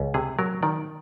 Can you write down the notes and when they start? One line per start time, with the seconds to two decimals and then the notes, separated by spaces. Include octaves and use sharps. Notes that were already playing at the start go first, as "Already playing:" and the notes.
Already playing: C#2
0.14 C3 G#4
0.39 F#3 A#4
0.63 D#3 D5